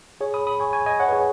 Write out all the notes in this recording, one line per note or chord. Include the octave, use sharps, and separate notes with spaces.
G#4 C#5
B5 D#6
B5 D#6
G#5 C#6
G#5 C#6
D#5 G#5
C#5 F#5
B4
G#4 C#5